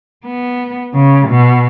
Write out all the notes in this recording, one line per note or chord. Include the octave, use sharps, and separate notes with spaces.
B3
C#3
B2